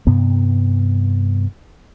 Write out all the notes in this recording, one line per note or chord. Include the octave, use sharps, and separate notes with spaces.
G2 C3 B3